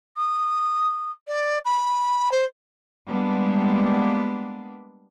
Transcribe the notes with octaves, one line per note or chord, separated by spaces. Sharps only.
D#6
D5
B5
C5
G3 G#3 A#3 B3 D4